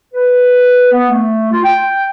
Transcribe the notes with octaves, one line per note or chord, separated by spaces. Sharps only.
B4
B3
A3
F4
G5